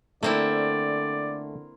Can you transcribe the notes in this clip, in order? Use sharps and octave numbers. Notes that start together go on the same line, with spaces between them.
D3 A3 A#3 C4 E4 D5